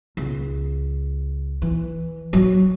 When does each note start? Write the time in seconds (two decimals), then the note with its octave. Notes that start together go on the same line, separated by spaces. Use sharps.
0.17 C#2
1.62 E3
2.33 F#3